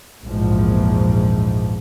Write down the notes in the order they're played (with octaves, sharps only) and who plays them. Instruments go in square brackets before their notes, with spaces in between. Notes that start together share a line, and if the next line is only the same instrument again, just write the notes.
[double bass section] A#1 E2 G#2 F3